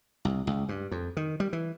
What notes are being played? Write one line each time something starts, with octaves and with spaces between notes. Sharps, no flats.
C2
C#2
G2
F2
D#3
G3
E3